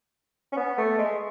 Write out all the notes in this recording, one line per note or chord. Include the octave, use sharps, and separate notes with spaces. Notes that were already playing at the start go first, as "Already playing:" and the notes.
C#4
B3
A3
G#3